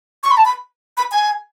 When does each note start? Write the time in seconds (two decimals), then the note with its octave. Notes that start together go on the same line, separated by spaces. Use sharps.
0.23 C#6
0.31 B5
0.37 A5
0.45 B5
0.97 B5
1.12 G#5